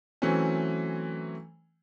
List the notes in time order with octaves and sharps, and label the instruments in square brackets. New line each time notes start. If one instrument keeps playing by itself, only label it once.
[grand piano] E3 F#3 A3 C4 C#4